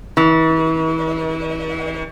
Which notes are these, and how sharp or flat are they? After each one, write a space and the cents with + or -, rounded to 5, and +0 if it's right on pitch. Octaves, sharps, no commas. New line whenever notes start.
E3 -35